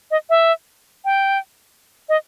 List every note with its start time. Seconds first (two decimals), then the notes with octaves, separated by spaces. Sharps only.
0.11 D#5
0.30 E5
1.05 G5
2.09 D#5